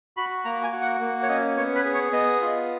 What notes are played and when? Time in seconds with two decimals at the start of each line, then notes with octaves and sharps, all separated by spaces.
0.17 F#4 B5
0.45 A#3 A#5
0.64 G#5
0.73 F#4
0.82 F#5
1.01 A#3
1.22 C#5
1.29 C#4 D#5
1.57 B3 C#5
1.75 B4
1.85 G#4
1.94 C#5
2.12 B3 D#5
2.41 F4